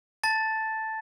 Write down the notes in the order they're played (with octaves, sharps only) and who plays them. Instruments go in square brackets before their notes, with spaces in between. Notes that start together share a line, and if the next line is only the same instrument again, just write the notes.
[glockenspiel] A5 A6